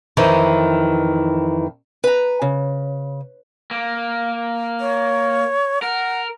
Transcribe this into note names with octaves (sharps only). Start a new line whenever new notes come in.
F2 D#3 E3 D#4
B4 A#5
C#3
A#3
C#5
A#4 F#5